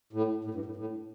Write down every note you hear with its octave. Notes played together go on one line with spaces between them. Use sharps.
A2
A2
G2
A2
A2